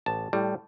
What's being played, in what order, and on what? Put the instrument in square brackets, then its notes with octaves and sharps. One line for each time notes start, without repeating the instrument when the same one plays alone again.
[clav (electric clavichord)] A1 A5
A2 G3